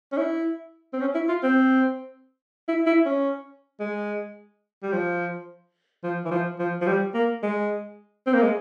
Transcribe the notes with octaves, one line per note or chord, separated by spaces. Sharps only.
C#4
E4
C4
C#4
E4
F4
C4
E4
E4
C#4
G#3
G3
F3
F3
E3
F3
F3
F3
G3
A#3
G#3
C4
A#3
G#3